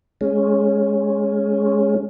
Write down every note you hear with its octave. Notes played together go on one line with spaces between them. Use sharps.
G#3 C#4